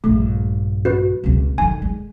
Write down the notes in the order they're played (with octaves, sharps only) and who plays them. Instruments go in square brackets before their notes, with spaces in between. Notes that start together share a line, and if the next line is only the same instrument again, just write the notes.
[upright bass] A#1 G2 [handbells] A3
[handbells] F#4 B4
[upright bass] C#2 C3
[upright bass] D3 D#3 [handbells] G#5
[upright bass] G#3